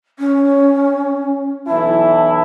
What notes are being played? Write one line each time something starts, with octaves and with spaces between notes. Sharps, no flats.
C#4
B1 E3 E4 A5